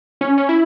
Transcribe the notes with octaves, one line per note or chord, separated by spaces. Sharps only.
C#4
C#4
E4